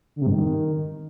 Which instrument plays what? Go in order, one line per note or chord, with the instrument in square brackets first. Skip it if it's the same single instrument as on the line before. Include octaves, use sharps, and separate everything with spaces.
[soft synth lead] D3
C3
G2
D#3